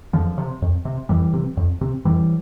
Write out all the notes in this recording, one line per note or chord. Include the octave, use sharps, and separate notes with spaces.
F2 D3 F3
C3
F2
C3
F2 E3 G3
C3
F2
C3
F2 E3 G3